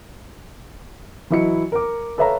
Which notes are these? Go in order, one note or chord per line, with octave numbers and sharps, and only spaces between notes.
E3 F#3 E4 D#5 C#7
A#4 D6
A4 B4 C#5 E5 F5 A#5